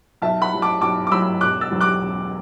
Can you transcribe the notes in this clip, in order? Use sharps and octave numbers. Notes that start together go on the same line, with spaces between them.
B1 E5 A5
F#5 B5
A2 F#3
A5 D6
B1 A5 D6
D6
A2 F#3 B5 E6
E1 D6 F#6
E6 A6
E2 D3 F#3
D6 F#6
E1